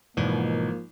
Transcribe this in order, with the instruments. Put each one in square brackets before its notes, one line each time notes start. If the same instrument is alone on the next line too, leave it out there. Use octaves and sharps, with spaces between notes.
[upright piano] G#1 [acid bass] B2 [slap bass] E3 [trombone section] F3 A#3